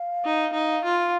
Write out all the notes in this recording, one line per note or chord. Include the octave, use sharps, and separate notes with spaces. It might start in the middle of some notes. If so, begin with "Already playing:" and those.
Already playing: F5
D#4
D#4
F4